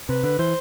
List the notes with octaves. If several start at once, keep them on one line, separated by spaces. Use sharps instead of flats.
C3 B4
D3 B4
E3 C5